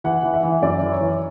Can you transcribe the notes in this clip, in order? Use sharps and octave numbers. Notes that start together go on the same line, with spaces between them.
E3 F#5
E3
E5
E3
F#2 D5
E3
C#5
E3